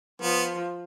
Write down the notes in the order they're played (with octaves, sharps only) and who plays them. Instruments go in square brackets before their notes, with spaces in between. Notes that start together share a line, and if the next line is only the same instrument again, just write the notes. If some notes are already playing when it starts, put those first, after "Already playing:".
[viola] F3 [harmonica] B3